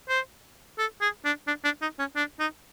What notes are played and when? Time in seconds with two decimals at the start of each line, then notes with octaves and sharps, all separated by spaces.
0.09 C5
0.78 A4
1.01 G#4
1.25 D4
1.47 D4
1.64 D4
1.82 D#4
1.99 C#4
2.16 D4
2.39 D#4